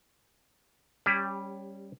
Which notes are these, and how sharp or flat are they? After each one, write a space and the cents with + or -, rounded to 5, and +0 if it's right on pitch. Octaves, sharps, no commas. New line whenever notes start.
G3 +0 C#4 -10 G4 +25